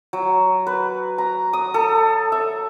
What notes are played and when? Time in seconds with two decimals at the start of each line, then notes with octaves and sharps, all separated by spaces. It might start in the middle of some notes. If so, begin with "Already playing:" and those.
0.13 F#3
0.67 B4
1.18 A#5
1.53 D#6
1.74 A4
2.32 E5